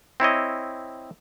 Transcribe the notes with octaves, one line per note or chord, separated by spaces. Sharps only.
C4 E4 C#5 D#5